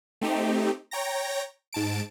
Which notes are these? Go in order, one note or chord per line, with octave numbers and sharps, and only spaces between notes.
A3 C4 D#4 G4
C#5 G5 A#5 A#6
G#2 A5 D7